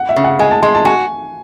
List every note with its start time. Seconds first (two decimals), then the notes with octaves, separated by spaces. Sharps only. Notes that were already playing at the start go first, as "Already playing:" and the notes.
Already playing: F#5
0.09 E5
0.16 C#3
0.24 F#5
0.39 G#3 G#5
0.51 A5
0.62 G#3 C6
0.75 A5
0.85 F#4 G#5